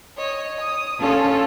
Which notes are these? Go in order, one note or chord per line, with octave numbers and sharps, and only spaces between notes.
C#5 D#5
D#6
C#4 F4 A4 C#5 A5